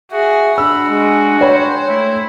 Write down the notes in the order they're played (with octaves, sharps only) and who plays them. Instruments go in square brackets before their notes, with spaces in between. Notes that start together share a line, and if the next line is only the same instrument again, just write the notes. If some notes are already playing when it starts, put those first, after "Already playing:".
[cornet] F#4 [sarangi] G#4 [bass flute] E5
[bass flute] D4 [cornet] F#4 [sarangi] B5 [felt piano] E6
[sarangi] G#3
[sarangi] C5 [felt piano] C#5 G5 B5
[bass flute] A3 [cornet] E4